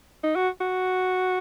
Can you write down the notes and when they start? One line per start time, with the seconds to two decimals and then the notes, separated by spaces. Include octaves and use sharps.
0.23 D#4
0.36 F#4
0.61 F#4